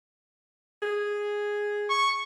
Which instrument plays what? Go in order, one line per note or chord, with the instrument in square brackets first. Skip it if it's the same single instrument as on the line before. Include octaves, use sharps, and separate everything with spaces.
[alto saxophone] G#4
[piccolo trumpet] C#6